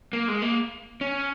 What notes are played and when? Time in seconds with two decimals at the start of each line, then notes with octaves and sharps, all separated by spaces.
0.13 A#3
0.28 G#3
0.42 A#3
1.01 C#4